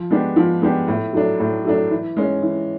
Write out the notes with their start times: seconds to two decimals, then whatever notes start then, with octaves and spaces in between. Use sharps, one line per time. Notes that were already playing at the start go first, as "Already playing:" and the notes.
Already playing: F3
0.10 G#3 B3 D4 G4
0.36 F3
0.62 G#3 B3 D4 G4
0.88 A2
1.13 F#3 A3 D4
1.40 A2
1.65 F#3 A3 D4
1.91 E3
2.17 G#3 C#4
2.42 E3